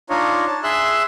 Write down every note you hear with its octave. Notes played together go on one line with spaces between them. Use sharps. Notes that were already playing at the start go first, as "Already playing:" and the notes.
D4 D#4 F4 C#5 D#5
A5
G#4 E5 C6 E6 F#6